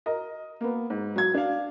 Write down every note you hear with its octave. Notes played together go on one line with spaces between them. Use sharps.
A#4 D#5
A#3 B3
G#2
F#3 G#6
D4 F5